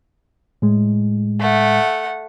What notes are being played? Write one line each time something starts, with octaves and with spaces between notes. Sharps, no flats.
A2 G#3
A3 F#5